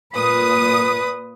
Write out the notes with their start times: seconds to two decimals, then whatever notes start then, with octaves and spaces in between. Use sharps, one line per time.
0.16 A#2 B4 D#6